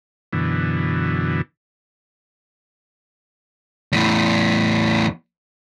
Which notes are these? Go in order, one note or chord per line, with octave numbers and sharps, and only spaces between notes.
F#2 B2 D3 E3
E2 A2